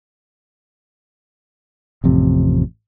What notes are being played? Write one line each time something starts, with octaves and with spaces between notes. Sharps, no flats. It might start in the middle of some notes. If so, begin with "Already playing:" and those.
A1 F2 C3